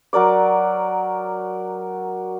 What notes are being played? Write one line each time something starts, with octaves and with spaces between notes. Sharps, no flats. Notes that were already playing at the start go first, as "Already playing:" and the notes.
F#3 A#4 D5 D6